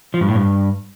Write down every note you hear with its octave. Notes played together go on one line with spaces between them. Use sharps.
F3
G2
A2
G2